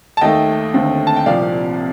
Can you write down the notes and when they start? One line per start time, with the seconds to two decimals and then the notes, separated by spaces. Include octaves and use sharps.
0.17 A5
0.21 D#2 D#3 A3 D#5 G5
0.74 D#2 D3 A3 C4
1.07 A5
1.16 G5
1.26 C2 A#2 F3 D5 F5